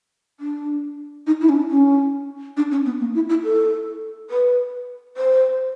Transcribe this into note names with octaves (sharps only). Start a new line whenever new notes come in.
D4
D#4
E4
C#4
D4
C#4
D4
C#4
B3
A#3
E4
E4
A4
B4
C5